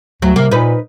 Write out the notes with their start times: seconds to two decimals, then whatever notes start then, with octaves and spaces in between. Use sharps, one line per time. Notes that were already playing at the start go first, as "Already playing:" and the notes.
0.22 D2 F#3
0.36 C3 A#3
0.51 A#2 D#4 B4